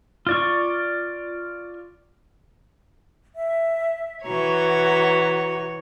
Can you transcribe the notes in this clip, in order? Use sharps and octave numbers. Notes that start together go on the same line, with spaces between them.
F4 D5 C#6
E5
E3 F#4 C#5 A#5